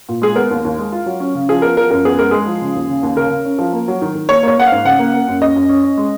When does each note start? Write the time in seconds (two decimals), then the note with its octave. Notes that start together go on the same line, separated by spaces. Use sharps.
0.09 A#2
0.22 G#3 G#4
0.36 B3 A#4
0.51 D#2
0.65 D#2
0.79 G#3
0.92 F4
1.06 F#3
1.20 C#4
1.35 C#3
1.49 F3 G#4
1.62 B3 A#4
1.77 F3 A#4
1.91 F#2 A#4
2.05 B3 G#4
2.18 G#3 A#4
2.31 G#3 G#4
2.46 F3
2.61 C#3
2.75 D#2
2.89 C#3
3.03 D#2
3.17 C#3 A#4
3.31 C#3
3.45 C#4
3.59 F3
3.73 A#3
3.88 F#3
4.02 D#3
4.15 D#3
4.29 A#3 C#5
4.43 A#3 C#5
4.58 A#3 F#5
4.67 F5
4.72 G#2
4.85 C#3 F#5
4.99 A#3
5.14 A#3
5.28 F#2
5.41 C#4 D#5
5.56 F#2
5.69 C#4
5.83 C#4
5.97 G#3